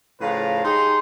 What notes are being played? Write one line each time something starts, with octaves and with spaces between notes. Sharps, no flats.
A2 C#3 F3 B4 F5 A#5
D#4 G4 G#4 C6